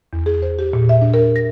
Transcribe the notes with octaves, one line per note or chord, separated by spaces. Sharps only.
E2
G#4
C5
G4
A#2
E5
D4
A#4
A#6